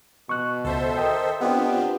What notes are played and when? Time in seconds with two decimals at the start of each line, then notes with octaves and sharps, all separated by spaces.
0.29 B2 C#6 F#6
0.64 C#2 A4 C5 E5
0.97 A#4 D#5 G5
1.41 B3 C4 D4 F4 G4